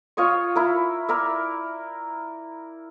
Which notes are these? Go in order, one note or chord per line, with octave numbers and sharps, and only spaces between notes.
F4 C#5 D#5 C#6
E4 A#4
A#4 D5 E5